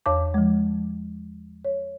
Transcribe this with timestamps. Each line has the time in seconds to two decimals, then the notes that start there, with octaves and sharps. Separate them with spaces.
0.06 E2 C#5 A5 D6
0.34 F3 G#3
1.65 C#5